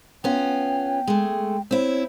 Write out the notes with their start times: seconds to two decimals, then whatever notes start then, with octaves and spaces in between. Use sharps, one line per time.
0.24 B3 C#4 F4 G5
1.07 G#3 A3
1.71 C4 E4 C#5